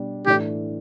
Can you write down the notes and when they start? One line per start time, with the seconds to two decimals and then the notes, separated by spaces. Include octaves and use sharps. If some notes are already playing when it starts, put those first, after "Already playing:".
Already playing: B2 G3 D4
0.26 A2 E3 A3 D4 G4